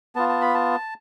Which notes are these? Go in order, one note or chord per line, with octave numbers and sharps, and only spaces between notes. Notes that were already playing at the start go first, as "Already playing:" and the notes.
B3 F4 A5
A5
B5
A5